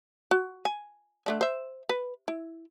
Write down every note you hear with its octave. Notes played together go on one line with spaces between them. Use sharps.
F#4
G#5
D3 A3 D4
C5 E5
B4
E4